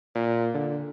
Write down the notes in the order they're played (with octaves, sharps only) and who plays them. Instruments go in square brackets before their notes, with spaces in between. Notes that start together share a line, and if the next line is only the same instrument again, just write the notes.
[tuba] A#2
D3